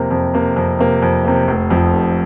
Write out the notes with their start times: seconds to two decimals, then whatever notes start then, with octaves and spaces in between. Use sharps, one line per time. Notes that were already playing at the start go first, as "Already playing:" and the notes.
Already playing: F2 C3 A#3
0.11 F2
0.34 C3 A#3
0.56 F2
0.79 C3 A#3
1.02 F2
1.25 C3 A#3
1.48 F1
1.70 F2 F3
1.93 F1